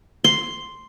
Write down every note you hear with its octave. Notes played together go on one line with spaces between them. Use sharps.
C6